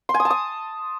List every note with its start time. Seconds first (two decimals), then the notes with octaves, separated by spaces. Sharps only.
0.09 C6
0.14 G#5
0.20 D#6
0.25 A5
0.30 D#6